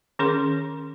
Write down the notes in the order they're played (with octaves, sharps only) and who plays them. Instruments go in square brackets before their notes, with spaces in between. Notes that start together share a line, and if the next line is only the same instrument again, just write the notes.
[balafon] D#3 C#4 G#4 A#4 C6